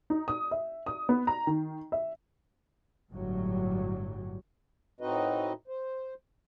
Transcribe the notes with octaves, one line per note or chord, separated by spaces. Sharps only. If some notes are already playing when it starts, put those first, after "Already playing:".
D#4
D#6
E5
D#6
B3
A#5
D#3
E5
G1 A2 F#3 G3
A2 C4 D#4 F#4 B4 D#5
C5